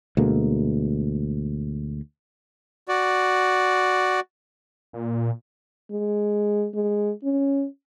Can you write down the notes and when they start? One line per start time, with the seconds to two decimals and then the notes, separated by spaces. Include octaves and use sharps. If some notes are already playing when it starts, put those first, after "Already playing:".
0.17 D2 B2 G#3 A#3
2.88 F#4 D5
4.93 A#2
5.91 G#3
6.74 G#3
7.24 C#4